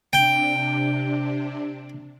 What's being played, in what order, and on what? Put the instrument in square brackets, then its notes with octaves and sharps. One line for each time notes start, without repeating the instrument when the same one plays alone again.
[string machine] C3 D4 [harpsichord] G5